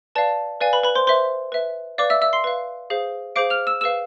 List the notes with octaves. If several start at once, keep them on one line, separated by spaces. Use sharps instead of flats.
B4 D5 F5 A5
B4 D5 F5 G#5
B4 B5
B4 B5
C5 C6
B4 C5 E5 C6
B4 E5
B4 D5 F5 D6
E5 E6
E5 E6
C6 C7
B4 F5
G#4 C5 F5
G#4 C5 F5 D6 D7
F6 F7
E6 E7
G#4 B4 F5 E6 E7